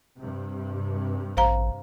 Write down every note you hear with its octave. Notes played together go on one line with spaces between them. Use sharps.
G2 C3
A1 C5 F5 A#5